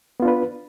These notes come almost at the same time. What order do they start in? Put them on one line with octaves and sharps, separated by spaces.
B3 F4 D4 B4